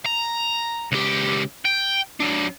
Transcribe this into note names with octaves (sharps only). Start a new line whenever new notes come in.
A#5
C#2 G4
G5
F#3 D4